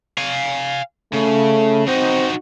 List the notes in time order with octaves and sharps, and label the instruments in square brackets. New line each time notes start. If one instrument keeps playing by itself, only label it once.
[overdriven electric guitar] F5 G#5
[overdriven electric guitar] C#3 [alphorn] A3
[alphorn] C4 [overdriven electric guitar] D#4 F#4